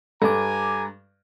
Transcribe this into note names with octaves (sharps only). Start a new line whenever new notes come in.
G2 A4 G#5 A#5 D6